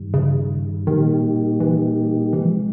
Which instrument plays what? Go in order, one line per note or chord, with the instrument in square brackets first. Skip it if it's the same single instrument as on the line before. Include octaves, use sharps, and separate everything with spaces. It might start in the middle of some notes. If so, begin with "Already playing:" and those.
Already playing: [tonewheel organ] G2 D#3 G3
[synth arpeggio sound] C#3
[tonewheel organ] A#2 G3 A#3 D#4 G4 [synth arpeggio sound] D#3
[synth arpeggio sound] E3
[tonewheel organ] C3 F3 G#3 [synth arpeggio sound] E3